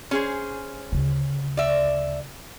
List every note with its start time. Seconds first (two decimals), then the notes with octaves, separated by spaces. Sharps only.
0.11 C#4 G#4 C5
0.92 D2 C#3
1.57 D5 E5